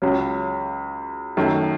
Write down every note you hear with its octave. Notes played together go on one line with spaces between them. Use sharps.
C#2 C#3 F#3 C#4
F#2 D#3 A3